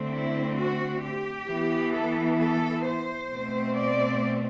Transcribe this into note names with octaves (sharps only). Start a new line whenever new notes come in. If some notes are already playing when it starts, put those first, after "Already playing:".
Already playing: D3 A3 C4
E4
F#4
G4
E3 B3
A4
A4
C5
B2 A3 C4
D5